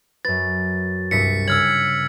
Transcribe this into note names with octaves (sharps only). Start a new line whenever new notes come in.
F#2 B4 A6
C2 G2 B6 C#7
C#3 E6 F6 G#6 F#7